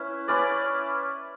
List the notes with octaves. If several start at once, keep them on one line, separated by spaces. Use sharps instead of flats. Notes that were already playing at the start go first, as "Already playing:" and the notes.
Already playing: C#4 E4 B4
C#4 E4 B4 D5